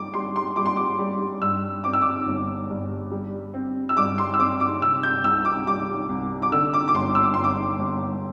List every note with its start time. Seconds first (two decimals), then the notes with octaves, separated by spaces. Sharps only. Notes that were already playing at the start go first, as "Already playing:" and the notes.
Already playing: G3 D6
0.14 G3 C6
0.36 C6
0.56 G3 D6
0.66 C6
0.76 D6
0.99 G3
1.41 G2 E6
1.84 C4 D6
1.93 E6
2.01 D6
2.27 G1
2.70 G2
3.11 G3
3.54 C4
3.89 E6
3.97 G2 D6
4.18 C6
4.34 E6
4.39 C4 D6
4.60 D6
4.82 C3 E6
5.03 G6
5.24 C2 E6
5.45 D6
5.67 G3 D6
6.09 C2
6.42 D6
6.52 D3 E6
6.74 D6
6.88 D6
6.94 G1 C6
7.15 E6
7.24 D6
7.34 G1 C6
7.44 D6
7.79 G1